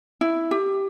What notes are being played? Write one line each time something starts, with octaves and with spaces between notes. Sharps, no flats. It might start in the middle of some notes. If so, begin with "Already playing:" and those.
E4
G4